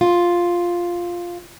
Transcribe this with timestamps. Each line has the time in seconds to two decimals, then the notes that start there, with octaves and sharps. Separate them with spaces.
0.01 F4